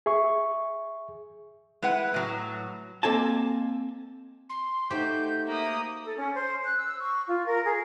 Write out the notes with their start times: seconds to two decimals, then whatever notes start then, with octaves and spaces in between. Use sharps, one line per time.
0.06 G#4 E5 C#6
1.82 G#3 E4 B4 F#5
2.14 A2 F#3
3.03 A#3 C4 A4 D#5 G#5 A5
4.50 C6
4.91 A3 D#4 F#4 G4 C5 G6
5.47 A#3 E5 D#6
6.04 A4
6.17 C#4
6.34 C5
6.64 F#6
6.77 E6
6.99 C#6
7.27 F4
7.46 A#4
7.65 G#4